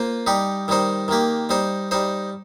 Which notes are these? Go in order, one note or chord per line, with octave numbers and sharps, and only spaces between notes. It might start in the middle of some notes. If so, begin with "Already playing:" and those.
Already playing: A#3 F4 C5
G3 D#4 G4
D#3 G3 D#4 C5
D#3 A#3 G4
G3 D#4 C5
G3 D#4 C5